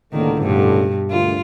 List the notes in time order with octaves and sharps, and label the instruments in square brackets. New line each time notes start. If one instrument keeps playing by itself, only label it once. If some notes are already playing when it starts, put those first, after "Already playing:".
[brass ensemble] C#2 A2 D3 [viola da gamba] D#3 A#3
[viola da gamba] G2 B2
[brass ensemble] D2 A#2 [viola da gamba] F4